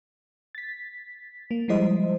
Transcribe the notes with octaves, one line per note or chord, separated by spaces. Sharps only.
A6 B6
A#3
F3 G3 G#3 E4 C5 D#5